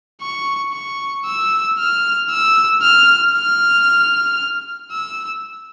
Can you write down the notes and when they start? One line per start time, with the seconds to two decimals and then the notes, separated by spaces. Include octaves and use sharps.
0.22 C#6
0.73 C#6
1.26 E6
1.78 F6
2.31 E6
2.82 F6
3.34 F6
4.92 E6